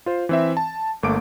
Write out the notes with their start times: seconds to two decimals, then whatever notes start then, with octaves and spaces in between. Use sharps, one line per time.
0.06 F4 C5
0.29 E3 C4 E5
0.57 A5
1.03 G1 A3 A#3 D6 D7